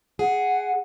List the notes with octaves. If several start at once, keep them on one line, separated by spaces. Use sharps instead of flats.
G#4 F#5